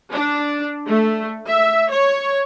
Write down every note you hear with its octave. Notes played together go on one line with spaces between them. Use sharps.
D4
A3
E5
C#5